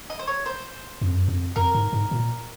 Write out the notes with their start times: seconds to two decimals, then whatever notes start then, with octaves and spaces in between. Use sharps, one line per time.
0.10 D#5
0.19 C5
0.27 C#5
0.46 C5
1.01 F2
1.14 F#2
1.28 F2
1.56 F2 A#4
1.75 G#2
1.93 G#2
2.11 A#2